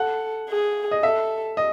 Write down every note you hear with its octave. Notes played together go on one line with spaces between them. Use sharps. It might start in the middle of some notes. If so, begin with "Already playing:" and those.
Already playing: A4 F#5
G#4
D#5
A4 E5
D#5